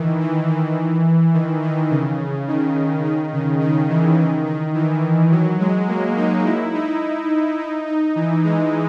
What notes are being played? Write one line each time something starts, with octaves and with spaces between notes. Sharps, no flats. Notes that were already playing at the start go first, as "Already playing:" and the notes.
Already playing: D#3 E3
E3
E3
D#3
D#3
C#3
D#3
D#3
C#3
D#3
E3
D#3
D#3
E3
F#3
G#3
A#3
D#4
E4
D#4
D#4
D#4
E3
G#3